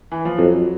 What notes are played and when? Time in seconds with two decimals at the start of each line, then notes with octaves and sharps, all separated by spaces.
0.12 E3
0.25 F3
0.38 F2 F#3